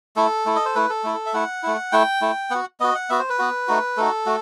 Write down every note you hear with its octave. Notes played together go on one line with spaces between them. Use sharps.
A3 E4 A4
A3 E4
D#5
C5
A3 E4 B4
A4
A3 E4
E5
A3 E4 F#5
A3 E4
A3 E4 G5
A3 E4
B3 F#4 F#5
B3 F#4 D#5
F#5
B3 F#4 E5
C5
B4
B3 F#4
A3 D#4 F#4
A3 D#4 F#4 A4
A3 F#4